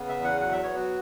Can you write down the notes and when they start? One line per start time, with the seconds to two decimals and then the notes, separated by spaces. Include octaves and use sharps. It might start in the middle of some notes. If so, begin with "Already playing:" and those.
Already playing: C#3 B3
0.09 E5
0.17 E2
0.24 F#5
0.40 F#3 F#5
0.52 E5
0.63 B3 C#5
0.76 F#4